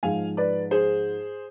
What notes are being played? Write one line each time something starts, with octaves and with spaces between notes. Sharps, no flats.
G#2 F3 G#3 F5 G#5
B4 D5
G#4 C5